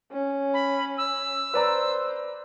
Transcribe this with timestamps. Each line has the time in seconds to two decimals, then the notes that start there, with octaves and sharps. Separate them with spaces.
0.11 C#4
0.54 B5
0.98 E6
1.54 B4 C5 D5 A#5